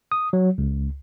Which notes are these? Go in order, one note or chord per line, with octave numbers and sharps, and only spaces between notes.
D#6
F#3
C#2